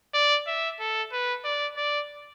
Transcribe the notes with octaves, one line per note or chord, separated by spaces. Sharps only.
D5
E5
A4
B4
D5
D5